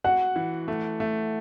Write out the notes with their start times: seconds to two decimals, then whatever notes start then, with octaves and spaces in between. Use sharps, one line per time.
0.04 F#4 F#5
0.36 E3
0.68 A3
1.00 A3